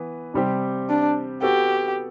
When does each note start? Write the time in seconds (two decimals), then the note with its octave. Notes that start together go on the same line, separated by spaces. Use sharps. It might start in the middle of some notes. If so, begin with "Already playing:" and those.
Already playing: E3 B3
0.34 C3 G3 C4 G4 C5
0.89 D4
1.42 B3 F#4 G4 A4